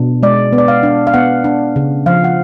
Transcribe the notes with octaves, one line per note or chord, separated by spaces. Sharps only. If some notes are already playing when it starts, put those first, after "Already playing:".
Already playing: B2 D4
G#3 D5
B3
D5
F5
D4
F5
B3 F#5
D4
C#3
F3 F5
F#5